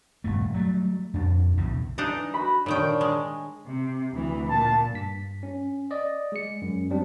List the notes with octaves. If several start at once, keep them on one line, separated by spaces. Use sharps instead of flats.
D#1 G2 A3
F#3 G3 A3
F2 D4
B1 E2 A2 C#3
E3 D4 D#4 D#5
F#4 B5
A#2 D#3 D4 C#5 G5
G#3
C3
D2 E3
A#2 A5
G2 B6
C#4
D5 D#5
G#3 C#7
F#2
F#3 G3 C4 D4